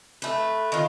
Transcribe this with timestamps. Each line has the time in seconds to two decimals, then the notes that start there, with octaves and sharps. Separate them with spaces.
0.22 A3 B4
0.72 D#3 F4